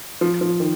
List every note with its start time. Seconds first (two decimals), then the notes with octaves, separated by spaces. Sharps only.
0.21 F3
0.41 F3
0.60 D#3